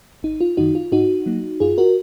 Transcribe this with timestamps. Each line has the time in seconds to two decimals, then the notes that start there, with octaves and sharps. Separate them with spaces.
0.23 G#1 D#4
0.41 F4
0.57 F#2 D#3 D#4 F#4
0.75 F4
0.92 G#2 D#4 F#4
1.26 F#3 A#3
1.60 F#2 F4 G#4
1.78 F#4 A#4